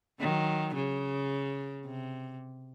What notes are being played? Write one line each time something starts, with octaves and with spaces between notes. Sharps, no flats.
D#3 F#3
C#3
C3